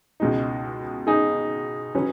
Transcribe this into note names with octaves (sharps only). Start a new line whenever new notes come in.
C#2 B2 G#3 D#4
D#4 G#4
F#3 C#4 B4